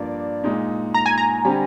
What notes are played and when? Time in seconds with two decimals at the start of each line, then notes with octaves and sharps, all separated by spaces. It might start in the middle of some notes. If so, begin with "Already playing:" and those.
Already playing: G2 F3 A#3 D4 D5
0.44 A#2 G#3 D#4
0.94 A#5
1.06 G#5
1.18 A#5
1.45 D3 G3 C4 G4